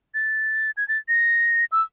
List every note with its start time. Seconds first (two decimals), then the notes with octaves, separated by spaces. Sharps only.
0.14 A6
0.77 G#6
0.88 A6
1.08 A#6
1.72 E6